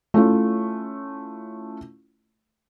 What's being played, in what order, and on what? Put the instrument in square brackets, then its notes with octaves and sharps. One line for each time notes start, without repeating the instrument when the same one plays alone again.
[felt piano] A3 C#4 E4 F4